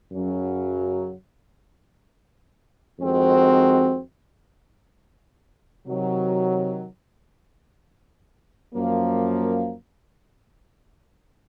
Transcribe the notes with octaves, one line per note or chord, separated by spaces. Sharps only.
F#2 C#3 F#3 C#4
F2 D#3 G#3 C4 F#4
C3 D#3 F#3
F#2 F3 A#3